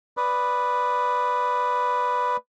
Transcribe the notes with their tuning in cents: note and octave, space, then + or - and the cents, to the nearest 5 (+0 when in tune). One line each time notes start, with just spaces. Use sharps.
B4 +0 D5 +0 D#6 +0